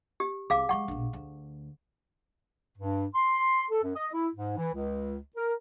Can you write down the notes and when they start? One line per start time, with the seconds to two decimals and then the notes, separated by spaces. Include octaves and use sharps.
0.20 G4
0.50 C2 G#4 F5 D6
0.69 F#3 G#3 F#5 C#6
0.88 A#1 B2
1.13 D2
2.78 G2
3.14 C6
3.71 A4
3.83 F#2
3.95 D#5
4.13 E4
4.35 G#2
4.57 E3
4.73 C#2
5.36 A#4